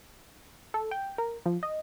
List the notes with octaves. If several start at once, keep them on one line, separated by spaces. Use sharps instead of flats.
A4
G5
A#4
F3
D#5